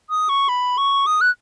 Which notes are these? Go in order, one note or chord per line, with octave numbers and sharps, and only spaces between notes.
D#6
C#6
B5
C#6
D#6
F#6